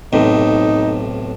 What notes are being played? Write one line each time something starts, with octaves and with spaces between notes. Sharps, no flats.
B1 A2 C3 D#4